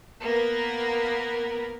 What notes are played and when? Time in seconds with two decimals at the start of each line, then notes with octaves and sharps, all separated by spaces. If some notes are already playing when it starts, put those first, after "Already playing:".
0.23 A#3 B3 A#4 B4